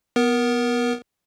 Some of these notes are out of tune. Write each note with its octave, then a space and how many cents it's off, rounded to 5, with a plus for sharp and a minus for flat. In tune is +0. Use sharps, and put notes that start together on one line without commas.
B3 +0 A#4 +20